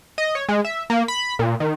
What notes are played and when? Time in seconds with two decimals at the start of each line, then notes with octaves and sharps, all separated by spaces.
0.18 D#5
0.35 C#5
0.49 G#3
0.65 E5
0.90 A#3
1.08 B5
1.39 A#2
1.60 D#3